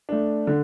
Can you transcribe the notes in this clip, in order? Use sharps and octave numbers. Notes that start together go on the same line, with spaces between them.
A3 D4
D3